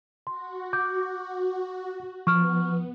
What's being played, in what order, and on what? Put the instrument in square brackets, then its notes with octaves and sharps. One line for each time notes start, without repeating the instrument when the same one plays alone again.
[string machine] F#4 [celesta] C6
[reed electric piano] D6 [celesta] G6
[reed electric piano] F3 [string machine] B3 [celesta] C#6 F6